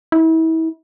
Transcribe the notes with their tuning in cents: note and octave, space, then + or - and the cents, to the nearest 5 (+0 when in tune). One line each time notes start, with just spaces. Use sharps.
E4 -35